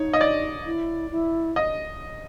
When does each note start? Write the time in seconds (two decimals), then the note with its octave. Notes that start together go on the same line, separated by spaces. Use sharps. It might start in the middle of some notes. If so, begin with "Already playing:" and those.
Already playing: D#4 C#5
0.13 D#5
0.21 D5
0.66 E4
1.11 E4
1.56 D#5